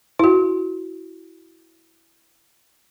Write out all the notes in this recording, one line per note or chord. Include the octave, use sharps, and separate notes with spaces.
E4 F#4